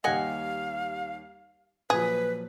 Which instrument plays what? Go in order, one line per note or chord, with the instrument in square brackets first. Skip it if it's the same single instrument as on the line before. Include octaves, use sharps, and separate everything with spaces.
[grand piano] D#2 G3 [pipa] D#5 F#5 G#5 [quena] F5
[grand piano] A#2 F3 F#3 [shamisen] G#4 [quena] B4